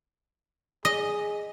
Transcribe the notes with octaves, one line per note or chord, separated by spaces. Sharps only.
G#4 D#5